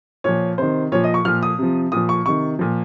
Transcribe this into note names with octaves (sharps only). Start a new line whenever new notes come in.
A#2 F3 C#5
C3 D#3 C5
A#2 F3 C#5
D#5
C#6
A#2 F3 F6
D#6
C3 F3
A#2 F3 D#6
C#6
C3 D#3 C#6
A#2 F3